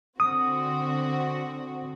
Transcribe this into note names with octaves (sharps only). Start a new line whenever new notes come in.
D3 C4 F#4 D#6